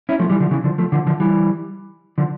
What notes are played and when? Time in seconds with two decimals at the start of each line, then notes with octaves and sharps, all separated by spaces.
0.09 C#4 E4
0.19 F3 A3
0.30 E3 G3
0.40 D3 F3
0.51 C#3 E3
0.64 D3 F3
0.78 F3 A3
0.92 D3 F3
1.07 D3 F3
1.20 E3 G3
2.18 D3 F3